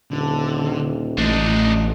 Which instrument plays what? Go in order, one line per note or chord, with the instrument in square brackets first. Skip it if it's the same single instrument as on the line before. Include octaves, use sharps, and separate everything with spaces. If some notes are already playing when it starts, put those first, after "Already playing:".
[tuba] D#1 [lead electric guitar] D3
[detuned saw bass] A1 [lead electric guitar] A3 D#5 [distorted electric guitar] D4 D#4